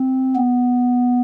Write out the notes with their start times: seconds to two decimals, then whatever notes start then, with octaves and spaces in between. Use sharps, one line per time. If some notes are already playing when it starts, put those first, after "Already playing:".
Already playing: C4
0.36 B3